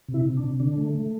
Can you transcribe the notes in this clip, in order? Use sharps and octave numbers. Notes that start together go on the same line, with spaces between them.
C3
E4
C3
D4
C3
D3 D4
A3
A3